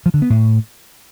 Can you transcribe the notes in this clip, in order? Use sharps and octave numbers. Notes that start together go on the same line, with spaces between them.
F3
D3
B3
A2